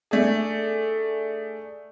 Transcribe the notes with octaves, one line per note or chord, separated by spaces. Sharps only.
A3 D4 G#4